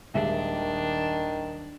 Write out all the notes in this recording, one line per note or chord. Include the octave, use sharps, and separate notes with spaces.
D#1 D#3 G#3 D4 E5